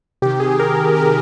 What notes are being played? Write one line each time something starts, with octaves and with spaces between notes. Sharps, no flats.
C3 D#3 G4
G#4
G#4
A#4
A#4